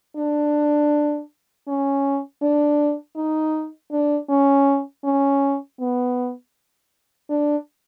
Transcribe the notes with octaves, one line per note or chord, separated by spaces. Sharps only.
D4
C#4
D4
D#4
D4
C#4
C#4
B3
D4